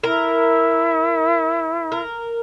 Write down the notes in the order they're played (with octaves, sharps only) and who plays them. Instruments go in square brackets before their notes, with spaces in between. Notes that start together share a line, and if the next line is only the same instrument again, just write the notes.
[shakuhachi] E4 [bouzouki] A#4
[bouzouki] A#4